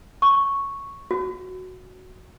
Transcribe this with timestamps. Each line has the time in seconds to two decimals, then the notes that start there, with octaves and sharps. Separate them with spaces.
0.22 C#6
1.11 F#4